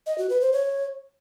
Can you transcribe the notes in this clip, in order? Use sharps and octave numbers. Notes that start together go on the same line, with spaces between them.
D#5
F#4
B4
C5
C#5